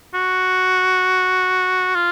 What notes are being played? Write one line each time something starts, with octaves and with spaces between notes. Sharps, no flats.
F#4
F4